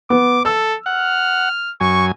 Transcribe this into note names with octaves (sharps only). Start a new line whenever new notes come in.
B3 D6
A4 E6
F#5 F6
F#2 G#5 C#6